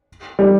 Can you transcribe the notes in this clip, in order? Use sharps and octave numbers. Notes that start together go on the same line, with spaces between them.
G3